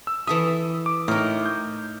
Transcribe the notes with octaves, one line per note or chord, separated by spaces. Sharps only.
E6
E3 A4 E5 D#6
D6
A2 D#4 A#4
G6